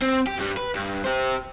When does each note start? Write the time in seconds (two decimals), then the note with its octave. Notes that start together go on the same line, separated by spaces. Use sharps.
0.01 C4
0.27 G4
0.39 G2 G3
0.57 B4
0.75 G2
1.04 G4 C5